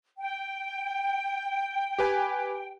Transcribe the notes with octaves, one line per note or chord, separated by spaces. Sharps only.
G5
G4 B4 G#5